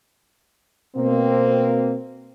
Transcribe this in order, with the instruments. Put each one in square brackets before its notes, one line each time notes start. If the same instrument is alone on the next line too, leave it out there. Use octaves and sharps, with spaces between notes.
[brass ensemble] B2 A#3 C4